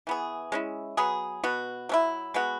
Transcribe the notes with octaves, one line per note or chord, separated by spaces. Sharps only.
E3 B3 G#4
G#3 C#4 E4
F#3 B3 G#4
B2 B3 F#4
F#3 C#4 E4
G#3 B3 F#4